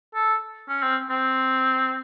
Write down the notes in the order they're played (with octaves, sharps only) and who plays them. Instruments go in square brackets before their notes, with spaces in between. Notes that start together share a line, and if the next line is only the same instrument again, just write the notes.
[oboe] A4
C#4
C4
C4